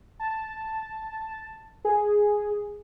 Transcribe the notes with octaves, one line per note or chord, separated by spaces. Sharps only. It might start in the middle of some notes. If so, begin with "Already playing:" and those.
A5
G#4